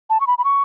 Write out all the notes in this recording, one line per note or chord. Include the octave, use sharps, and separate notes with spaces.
A5
C#6
B5
B5
C#6